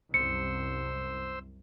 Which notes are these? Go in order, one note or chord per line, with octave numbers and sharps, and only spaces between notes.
C2 F#2 C5 E6 C#7